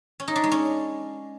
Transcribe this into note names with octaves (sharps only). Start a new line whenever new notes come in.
C#4
D#4
D4
G#3
C#4